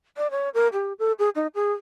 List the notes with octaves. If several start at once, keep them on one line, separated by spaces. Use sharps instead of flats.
D5
C#5
A#4
G4
A4
G#4
D#4
G#4